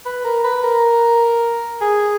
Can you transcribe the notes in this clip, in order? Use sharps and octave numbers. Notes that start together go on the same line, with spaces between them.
B4
A#4
B4
A#4
G#4